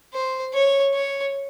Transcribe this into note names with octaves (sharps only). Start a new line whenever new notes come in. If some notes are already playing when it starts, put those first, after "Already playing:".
C5
C#5
C#5